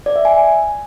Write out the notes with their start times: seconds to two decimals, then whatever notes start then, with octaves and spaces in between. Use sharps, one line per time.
0.06 D5
0.16 E5
0.25 G#5